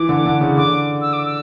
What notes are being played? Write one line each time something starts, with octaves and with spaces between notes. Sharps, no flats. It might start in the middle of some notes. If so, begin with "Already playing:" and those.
Already playing: E3 D6
D3
D3
C#3
D3 D6
E6
D6
E6